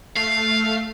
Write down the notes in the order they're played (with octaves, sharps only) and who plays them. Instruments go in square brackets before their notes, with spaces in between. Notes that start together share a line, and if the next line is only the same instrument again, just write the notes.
[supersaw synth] A3 [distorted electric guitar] F5